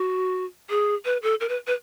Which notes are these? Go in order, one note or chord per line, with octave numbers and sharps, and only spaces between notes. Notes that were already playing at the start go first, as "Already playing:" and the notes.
Already playing: F#4
G#4
B4
A4
A#4
B4
B4